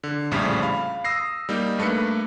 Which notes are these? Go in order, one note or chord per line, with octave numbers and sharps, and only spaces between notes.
D3
A#1 F2 A2 C#3 G3
F5 B5
D#6 E6 A#6 C7
G3 A#3 D#4
G2 A3 A#3 B4 C#7